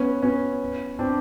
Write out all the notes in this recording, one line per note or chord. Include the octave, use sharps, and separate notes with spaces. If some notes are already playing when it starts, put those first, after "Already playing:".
Already playing: B3 C#4
B3 C#4
C4 D4